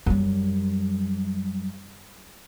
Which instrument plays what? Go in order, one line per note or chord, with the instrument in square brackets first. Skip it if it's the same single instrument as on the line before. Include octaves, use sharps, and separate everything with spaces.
[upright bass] F#2 G3